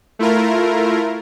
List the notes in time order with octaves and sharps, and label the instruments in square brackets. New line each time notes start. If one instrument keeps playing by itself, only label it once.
[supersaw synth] A3 E4 F4 A#4